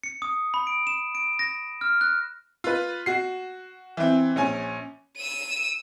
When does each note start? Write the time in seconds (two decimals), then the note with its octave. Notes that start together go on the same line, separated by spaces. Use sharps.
0.03 C#7
0.22 D#6
0.54 B5
0.67 D7
0.87 E7
1.15 D7
1.39 A#6
1.81 F6
2.01 F#6
2.64 F4 B4
3.06 F#4 C7
3.97 E3 C4
4.36 A#1 C#4 G#5
5.18 E6 D#7